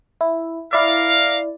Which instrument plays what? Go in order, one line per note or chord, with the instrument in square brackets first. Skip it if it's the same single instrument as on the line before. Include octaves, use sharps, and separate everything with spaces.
[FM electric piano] E4
[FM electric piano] E4 D5 [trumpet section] A#4 F5